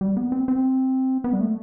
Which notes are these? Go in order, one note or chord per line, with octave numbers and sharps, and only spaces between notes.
G3
B3
C4
C4
B3
G3
A3